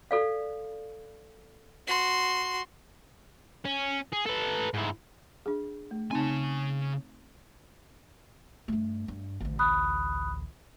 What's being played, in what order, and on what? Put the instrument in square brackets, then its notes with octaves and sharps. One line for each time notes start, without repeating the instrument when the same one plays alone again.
[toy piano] A4 D5 F5
[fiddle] F#4 C6
[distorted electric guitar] C#4
G#4
A4 B4
G#2 E4
[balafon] D4 G#4
A3
[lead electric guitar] C#3 G#5 [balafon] C4 D#4 A5
[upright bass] G2 A3
G2
A1 D2
[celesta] B5 D#6 F#6